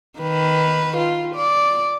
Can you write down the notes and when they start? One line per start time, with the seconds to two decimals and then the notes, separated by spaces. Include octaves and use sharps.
0.19 D#3 B4
0.97 F4
1.35 D5